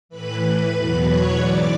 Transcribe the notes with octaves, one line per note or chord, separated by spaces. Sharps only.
A2 E3 B4 B5
E2 B2 F#3 B4 B5
C#5 C#6
G#2 E3 D5 D6